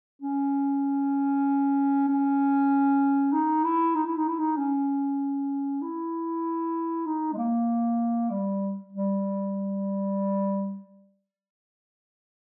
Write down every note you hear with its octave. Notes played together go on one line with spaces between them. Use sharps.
C#4
C#4
D#4
E4
D#4
E4
D#4
E4
D#4
C#4
E4
D#4
G#3
A#3
G3
G3